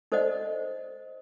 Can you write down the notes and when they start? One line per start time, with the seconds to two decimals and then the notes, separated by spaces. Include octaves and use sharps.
0.12 D#4 A4 C5 D5 D#5 F#5